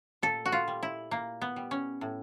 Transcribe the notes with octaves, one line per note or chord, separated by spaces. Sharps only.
A#2 A4
F#4
F4
G3
E4
A#2 A#3
B3
G3
C#4
A2